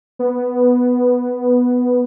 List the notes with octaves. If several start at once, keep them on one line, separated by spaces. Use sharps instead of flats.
B3